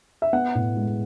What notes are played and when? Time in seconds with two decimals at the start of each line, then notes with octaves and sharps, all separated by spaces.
0.22 E5
0.33 B3 F#5
0.55 A2
0.77 G#3